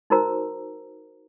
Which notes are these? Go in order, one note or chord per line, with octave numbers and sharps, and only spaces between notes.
D#4 F#4 A#4 C5 A#5 E6